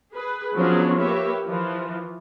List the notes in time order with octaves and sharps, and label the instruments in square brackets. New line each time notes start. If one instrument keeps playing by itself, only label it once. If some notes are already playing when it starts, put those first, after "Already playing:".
[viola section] G#4 B4
F3 F#3 B3 C#4 D4 G#4
A#3 G4 B4 C#5 E5
E3 F3